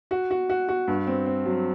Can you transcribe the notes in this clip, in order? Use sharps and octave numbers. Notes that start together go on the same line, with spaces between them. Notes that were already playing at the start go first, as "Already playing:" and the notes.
F#4
F#4
F#4
F#4
G2
C4
C4
F#3